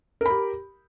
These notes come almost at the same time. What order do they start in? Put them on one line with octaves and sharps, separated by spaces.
A#4 B5 G4